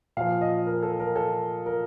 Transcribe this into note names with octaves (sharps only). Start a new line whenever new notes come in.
A#2 F3 F5
D#5
A#4
A4
A#4
A4
A#4